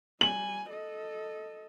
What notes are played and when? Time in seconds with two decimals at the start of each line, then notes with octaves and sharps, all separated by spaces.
0.21 G3 G#5 F#7
0.70 A4 D#5